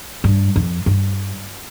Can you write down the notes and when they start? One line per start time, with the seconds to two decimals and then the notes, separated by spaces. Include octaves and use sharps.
0.24 G2
0.56 F2
0.86 G2